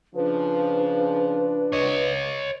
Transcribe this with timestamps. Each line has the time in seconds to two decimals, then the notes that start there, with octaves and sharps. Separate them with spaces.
0.15 C#3 F3 D4 B4
1.72 C#5 D#5